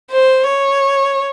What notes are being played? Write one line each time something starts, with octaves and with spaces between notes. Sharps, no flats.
C5
C#5